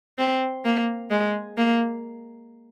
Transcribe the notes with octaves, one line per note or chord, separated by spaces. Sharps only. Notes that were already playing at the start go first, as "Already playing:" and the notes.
C4
A#3
G#3
A#3